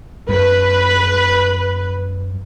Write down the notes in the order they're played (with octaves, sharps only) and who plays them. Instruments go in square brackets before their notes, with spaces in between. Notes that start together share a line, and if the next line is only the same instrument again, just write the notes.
[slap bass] F#2 [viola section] B4